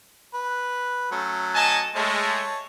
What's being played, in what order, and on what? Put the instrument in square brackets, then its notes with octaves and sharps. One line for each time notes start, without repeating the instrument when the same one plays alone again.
[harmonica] B4
F#3 A3 C#4
[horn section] D#5 G#5 A5
[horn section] G#3 A3 [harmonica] C#5 A5